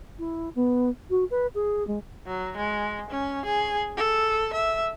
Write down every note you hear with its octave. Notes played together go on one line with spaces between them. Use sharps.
E4
B3
F#4
B4
G#4
G#3
F#3
G#3
C#4
G#4
A4
E5